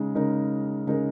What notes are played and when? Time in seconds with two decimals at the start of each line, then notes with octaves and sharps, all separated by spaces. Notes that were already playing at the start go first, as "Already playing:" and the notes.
Already playing: C#3 G#3 D#4
0.15 C#3 G#3 D#4 A#4
0.87 C#3 G#3 D#4 A#4